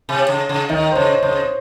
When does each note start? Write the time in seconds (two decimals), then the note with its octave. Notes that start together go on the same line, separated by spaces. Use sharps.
0.09 C3
0.29 C#3
0.49 C#3
0.69 D#3 D#5
0.92 C5
0.95 C#3 C#5
1.23 C#3 C5